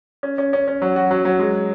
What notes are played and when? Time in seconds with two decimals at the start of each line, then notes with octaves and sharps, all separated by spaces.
0.23 C#4
0.38 C#4
0.53 C#4
0.68 C#4
0.82 F#3
0.96 F#4
1.11 F#3
1.25 F#3
1.39 G#3